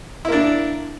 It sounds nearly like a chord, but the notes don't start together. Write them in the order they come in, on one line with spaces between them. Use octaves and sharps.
E4 A#3 D4